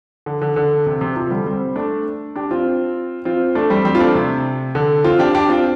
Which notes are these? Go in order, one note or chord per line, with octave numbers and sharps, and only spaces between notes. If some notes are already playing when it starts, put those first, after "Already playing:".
D3
D3
D3
C3
C3
C3 F3
D3 G3
G3 C4
A3 D4
D4 G4
C4 F4
C4 F4
A3 D4
G3 C4
G3 C4
F4
A3 D4
C3
D3
C4 F4
D4 G4
D4 G4
C4 F4